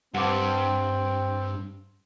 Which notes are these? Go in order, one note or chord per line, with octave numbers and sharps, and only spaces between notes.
G2 C4 F#5 D6